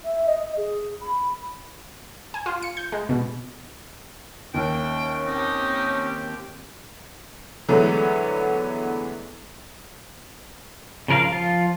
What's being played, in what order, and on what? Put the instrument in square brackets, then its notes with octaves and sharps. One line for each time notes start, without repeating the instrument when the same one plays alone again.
[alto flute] E5
D#5
D#5
G#4
B5
[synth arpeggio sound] G#5
F4
C#7
G6
G#3
B2
[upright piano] D#2 [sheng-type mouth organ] C#4 [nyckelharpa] E5 [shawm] G5
[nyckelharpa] C4 G4 [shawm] D#4
[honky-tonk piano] D3 E3 F#3 G#3 A3 B3
[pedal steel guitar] C#3 F3 A#4 C#5 F5
F3 F4